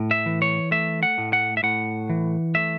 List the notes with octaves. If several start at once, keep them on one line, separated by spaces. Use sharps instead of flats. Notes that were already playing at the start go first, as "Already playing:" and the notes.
Already playing: A2
E5
E3
C#5
A3 E5
F#5
A2
F#5
E5
A2 F#5
E3
A3 E5